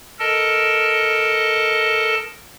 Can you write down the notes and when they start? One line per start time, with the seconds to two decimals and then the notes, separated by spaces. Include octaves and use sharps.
0.19 A4 A#4 D#5 A5